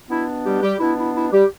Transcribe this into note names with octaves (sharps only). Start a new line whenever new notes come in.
B2 B3 D4 E4
G3 G4
G3 G4
B2 B3 D4 E4
E4
E4
G3 G4